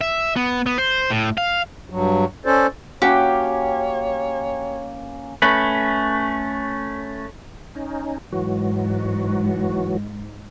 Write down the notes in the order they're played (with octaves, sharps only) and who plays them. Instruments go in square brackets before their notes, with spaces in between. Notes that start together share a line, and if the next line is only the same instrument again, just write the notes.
[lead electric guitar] E5
B3
B3
C5
A2
F5
[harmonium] G2 F#3
C#4 A4 C5 D5
[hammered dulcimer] A#3 C#4 [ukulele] F#4 [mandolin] G4 [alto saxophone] C#5
[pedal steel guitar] A3 C#4 B4
[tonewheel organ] C#4 D#4
[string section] G#2 [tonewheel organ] E3 F#3 F#4